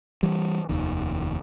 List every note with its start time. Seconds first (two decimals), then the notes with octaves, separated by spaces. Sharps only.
0.23 E3 G3
0.69 F1 D#2 D#3